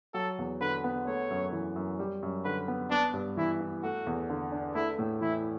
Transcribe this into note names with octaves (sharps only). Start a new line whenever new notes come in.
F#3 A4
E2
D3 B4
B3
A3 C#5
F#2
E3
F#2
G3
F#2
D3 B4
B3
B3 D4
G2
E3 E4
E4
A3 F#4
E2
D3
D4
A3 E4
A2
E3 E4